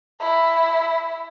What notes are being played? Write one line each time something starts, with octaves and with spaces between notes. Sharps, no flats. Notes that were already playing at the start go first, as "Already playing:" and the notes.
E4